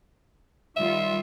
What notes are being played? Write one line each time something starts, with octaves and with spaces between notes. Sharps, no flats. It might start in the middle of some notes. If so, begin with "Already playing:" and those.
D#3 G3 F4 E5